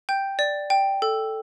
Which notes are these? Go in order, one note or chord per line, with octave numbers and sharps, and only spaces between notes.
G5 G6
D5
G5
A4